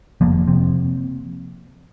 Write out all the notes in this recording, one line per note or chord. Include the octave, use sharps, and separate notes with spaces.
F1 F3 A#3
C3